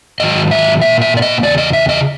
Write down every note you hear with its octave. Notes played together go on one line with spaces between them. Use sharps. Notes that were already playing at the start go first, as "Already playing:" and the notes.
G#2 D#3 F#3 D#5
E5
A#2 G3 A#3 E5
E5
D5
D#5
E2 C#3 D5
D#5
E5
D#5